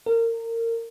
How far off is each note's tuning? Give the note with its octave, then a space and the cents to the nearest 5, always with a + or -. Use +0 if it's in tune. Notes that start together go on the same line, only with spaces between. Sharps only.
A#4 -25